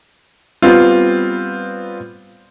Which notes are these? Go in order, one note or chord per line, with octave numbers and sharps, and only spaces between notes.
G3 B3 C4 F4